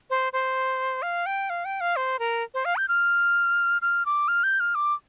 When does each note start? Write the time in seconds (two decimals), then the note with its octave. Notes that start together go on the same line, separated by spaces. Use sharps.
0.10 C5
0.33 C5
1.02 F5
1.26 G5
1.50 F5
1.65 G5
1.81 F5
1.96 C5
2.19 A#4
2.54 C5
2.65 F5
2.76 G6
2.88 F6
3.82 F6
4.06 D6
4.28 F6
4.43 G6
4.60 F6
4.75 D6